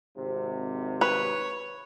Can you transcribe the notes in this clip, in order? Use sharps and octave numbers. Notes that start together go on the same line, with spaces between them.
G#1 C3
B4 C#5